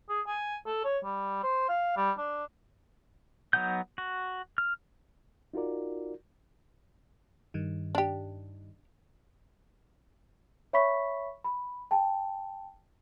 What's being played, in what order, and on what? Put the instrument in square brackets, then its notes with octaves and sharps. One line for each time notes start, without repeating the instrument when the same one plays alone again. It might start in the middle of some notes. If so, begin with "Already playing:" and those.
[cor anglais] G#4
G#5
A4
C#5
G3
C5
F5
G3
D4
[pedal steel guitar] F#3 B3 D#4 F#5 G6
F#4
F6
[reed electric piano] D#4 F4 F#4 A#4 D5
[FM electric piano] G2 D#3
[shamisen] D4 G4
[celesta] C#5 E5 B5 C#6 B6
B5
G5 A5